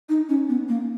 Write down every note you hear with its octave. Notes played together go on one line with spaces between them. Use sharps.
D#4
C#4
B3
A#3